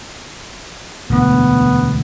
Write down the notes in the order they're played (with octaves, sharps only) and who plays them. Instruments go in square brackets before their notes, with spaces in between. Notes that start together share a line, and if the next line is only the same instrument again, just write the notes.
[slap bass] E1 D2 [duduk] B3